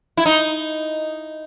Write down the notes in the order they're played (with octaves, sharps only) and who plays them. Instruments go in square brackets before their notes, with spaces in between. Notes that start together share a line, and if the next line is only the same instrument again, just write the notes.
[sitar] E4
D#4